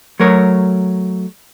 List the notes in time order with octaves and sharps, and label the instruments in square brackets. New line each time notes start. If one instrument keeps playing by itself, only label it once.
[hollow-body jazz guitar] F#3 A3 A#4 C#5